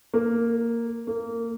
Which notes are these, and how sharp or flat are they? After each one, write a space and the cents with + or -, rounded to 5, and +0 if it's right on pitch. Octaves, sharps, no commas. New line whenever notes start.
A#3 -5
A#3 -20